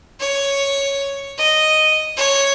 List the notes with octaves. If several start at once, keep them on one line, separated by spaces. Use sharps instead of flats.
C#5
D#5
C#5